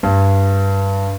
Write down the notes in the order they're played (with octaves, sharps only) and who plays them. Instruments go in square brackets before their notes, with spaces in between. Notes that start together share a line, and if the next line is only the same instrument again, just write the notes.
[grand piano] G2